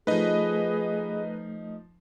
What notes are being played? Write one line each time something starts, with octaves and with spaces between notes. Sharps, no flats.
F3 A3 D#4 G#4 B4 D#5